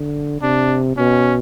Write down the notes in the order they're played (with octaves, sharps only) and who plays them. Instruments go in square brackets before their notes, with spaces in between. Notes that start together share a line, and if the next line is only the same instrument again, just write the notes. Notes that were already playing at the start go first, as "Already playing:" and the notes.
Already playing: [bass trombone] D3
[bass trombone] C3 [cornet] D4
[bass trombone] B2 [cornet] C#4